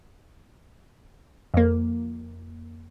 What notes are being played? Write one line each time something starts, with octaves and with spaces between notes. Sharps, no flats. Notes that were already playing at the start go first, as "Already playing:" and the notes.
F2 A#3